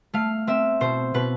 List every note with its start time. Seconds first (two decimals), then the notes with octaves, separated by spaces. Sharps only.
0.14 A3 F5
0.47 C4 E5
0.81 B2 C5
1.14 B2 B4